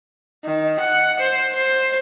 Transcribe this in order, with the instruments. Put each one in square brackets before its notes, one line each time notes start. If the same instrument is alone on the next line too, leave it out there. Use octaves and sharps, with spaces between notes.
[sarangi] D#3
F#5
C5
C5